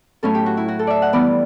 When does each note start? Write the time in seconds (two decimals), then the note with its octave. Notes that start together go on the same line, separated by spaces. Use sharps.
0.23 A2 F#3 C#4 A4
0.35 G4
0.46 F#4
0.57 E4
0.68 F#4
0.79 A4
0.87 D5 E5
1.02 F#5
1.13 E3 G3 B3 D5